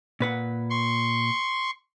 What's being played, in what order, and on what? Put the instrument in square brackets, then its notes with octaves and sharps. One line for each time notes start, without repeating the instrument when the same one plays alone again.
[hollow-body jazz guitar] A#2 B4 F#5
[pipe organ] C6 C#6